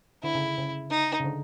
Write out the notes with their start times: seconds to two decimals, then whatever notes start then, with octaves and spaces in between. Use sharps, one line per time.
0.23 D3 E4
0.35 C#3
0.58 C#3
0.90 D#4
1.20 C#3
1.24 D3